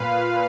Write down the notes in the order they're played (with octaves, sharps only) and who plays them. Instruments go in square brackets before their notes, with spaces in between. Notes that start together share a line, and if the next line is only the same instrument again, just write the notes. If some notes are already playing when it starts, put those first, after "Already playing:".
Already playing: [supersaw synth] A#2 B4 F5